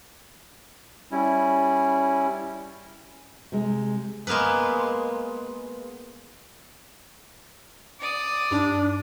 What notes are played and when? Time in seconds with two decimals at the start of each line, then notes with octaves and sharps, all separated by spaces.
1.11 G3 C#4 E4
3.52 C3 G#3
4.27 G#3 A#3 B3 A#4 B4
8.00 D5 D#6
8.51 G2 D4 D#4